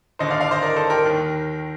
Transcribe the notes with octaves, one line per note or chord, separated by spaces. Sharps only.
D#2 D3 C5 D#5
D5 F5
D5 F5
C5 D#5
A#4 D5
A4 C5
G4 A#4
D#2 D#3